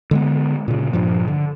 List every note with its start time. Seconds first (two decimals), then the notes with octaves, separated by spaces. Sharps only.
0.11 D3 G#3 B3
0.68 A#2 C#3
0.93 G2 A#2 F3
1.28 D3